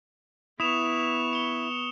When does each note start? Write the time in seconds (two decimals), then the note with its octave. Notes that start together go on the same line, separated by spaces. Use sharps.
0.60 B3 E4 C#6 D#6 E7 F7
1.33 C#7 G7